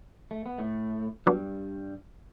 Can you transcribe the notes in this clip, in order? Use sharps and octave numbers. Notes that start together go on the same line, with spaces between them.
A3
B3
A2 A3
G2 F#3 G3 B3 D4